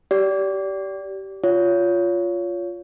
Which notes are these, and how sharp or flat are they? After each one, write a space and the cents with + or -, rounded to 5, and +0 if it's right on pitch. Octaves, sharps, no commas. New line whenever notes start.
G4 -20 D5 -25
F4 +0 C#5 +25